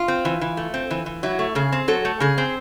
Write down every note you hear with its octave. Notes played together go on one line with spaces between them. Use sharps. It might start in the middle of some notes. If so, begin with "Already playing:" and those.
Already playing: F4
C4
E3
E3
A3
C4
E3
E3
F#3 E4
A3
C#3 G#4
C4
F#3 A4
A3
C#3 G#4
C4